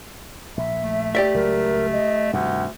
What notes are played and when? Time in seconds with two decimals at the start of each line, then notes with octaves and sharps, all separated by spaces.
0.57 A#1 E5
0.83 A3
1.15 G4 D5 E5
1.34 C#2 F#3 A#4
1.93 D#5
2.33 D2 G2 C3 D#3 F#5